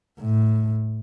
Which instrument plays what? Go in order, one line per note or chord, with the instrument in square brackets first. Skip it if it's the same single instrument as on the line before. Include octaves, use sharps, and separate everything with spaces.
[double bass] A2